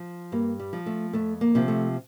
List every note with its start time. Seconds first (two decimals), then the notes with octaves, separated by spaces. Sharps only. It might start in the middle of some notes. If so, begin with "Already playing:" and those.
Already playing: F3
0.32 G2 A#3
0.59 G3
0.73 F3
0.86 A3
1.13 F2 A3
1.41 A#3
1.55 C3 F3
1.68 A3